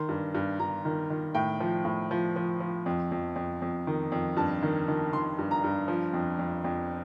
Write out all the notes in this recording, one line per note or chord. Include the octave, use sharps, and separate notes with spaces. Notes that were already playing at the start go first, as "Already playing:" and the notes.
Already playing: D#3 C6
G2
G2
G2 A#5
D#3
D#3
A2 G5
F3
A2
F3
F3
F3
F2
F2
F2
F2
D#3
F2
G2 A5
D#3
D#3
D#3 C6
G2
A#5
G2
F3
F2
F2
F2